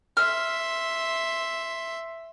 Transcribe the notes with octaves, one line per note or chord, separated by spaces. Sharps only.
E5 C6 F6